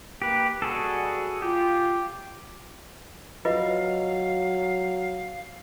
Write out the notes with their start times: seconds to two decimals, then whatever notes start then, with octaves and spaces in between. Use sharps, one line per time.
0.22 A#3 G4 B4
0.62 B2 G3 F#4 G#4 A4
1.42 F4 G4
3.45 F#3 F4 B4 D#5 F5